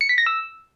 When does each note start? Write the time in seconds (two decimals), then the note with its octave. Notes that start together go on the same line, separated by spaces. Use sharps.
0.01 C#7
0.09 B6
0.18 A#6
0.26 E6